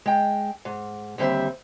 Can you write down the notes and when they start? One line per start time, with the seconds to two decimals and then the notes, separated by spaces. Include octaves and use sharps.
0.06 G#3 G5
0.65 G#2
1.18 D#2 D3 G3 C4 E5